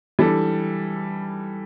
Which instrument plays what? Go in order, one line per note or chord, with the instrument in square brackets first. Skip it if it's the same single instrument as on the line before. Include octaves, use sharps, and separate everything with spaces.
[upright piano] E3 G3 D4 A4